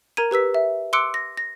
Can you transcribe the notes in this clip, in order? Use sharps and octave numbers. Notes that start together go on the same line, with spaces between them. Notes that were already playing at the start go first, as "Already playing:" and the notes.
A#4 A#5 G#6 D#7
G4 B4 E6 B6
E5
C6 D6 E6 F#6 C#7 D7
A#6
A#6